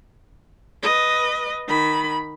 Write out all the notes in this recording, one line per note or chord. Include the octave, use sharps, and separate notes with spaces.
B4 D#5
D#3 B5